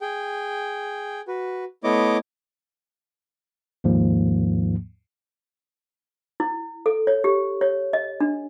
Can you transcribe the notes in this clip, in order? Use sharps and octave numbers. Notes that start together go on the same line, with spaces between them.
G#4 G5
F#4 B4
A3 B3 E4 C#5 D#5 D6
D#2 G#2 F3 A#3
E4
A4
C#5
G4
C#5
D#5
D4